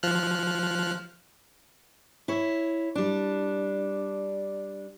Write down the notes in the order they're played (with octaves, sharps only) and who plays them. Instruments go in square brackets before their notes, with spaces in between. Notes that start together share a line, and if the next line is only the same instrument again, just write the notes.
[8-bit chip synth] F3 F6 F#6
[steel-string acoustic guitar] E4 C#5
G3 D4